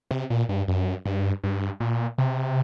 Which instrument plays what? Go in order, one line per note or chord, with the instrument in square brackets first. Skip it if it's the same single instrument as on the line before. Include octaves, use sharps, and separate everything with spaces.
[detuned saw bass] C3
A#2
G2
F#2
G2
G2
A#2
C3